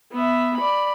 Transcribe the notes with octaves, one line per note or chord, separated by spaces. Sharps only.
B3 E5
D5 B5